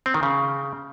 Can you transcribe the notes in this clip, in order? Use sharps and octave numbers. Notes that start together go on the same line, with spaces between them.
C4
D#3
C#3